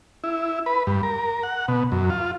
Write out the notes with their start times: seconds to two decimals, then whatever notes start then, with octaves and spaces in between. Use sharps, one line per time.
0.24 E4
0.66 B4
0.87 G2
1.03 A#4
1.43 F#5
1.68 B2
1.92 F#2
2.10 F4